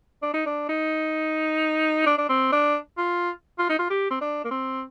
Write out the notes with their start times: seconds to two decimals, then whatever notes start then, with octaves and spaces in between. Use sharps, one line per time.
0.22 D4
0.34 D#4
0.46 D4
0.69 D#4
2.06 D4
2.18 D4
2.29 C4
2.52 D4
2.98 F4
3.59 F4
3.69 D#4
3.79 F4
3.90 G4
4.10 C4
4.21 D4
4.44 A#3
4.51 C4